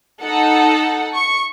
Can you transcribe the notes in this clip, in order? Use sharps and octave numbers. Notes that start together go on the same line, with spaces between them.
D#4 A4 F#5
C#6